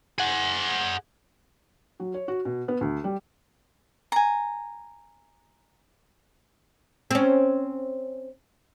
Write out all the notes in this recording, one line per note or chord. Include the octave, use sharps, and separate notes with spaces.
G#4 F#5
F#3
C#5
F#4
B2
B3
D2
G3
G#5 A#5
C4 C#4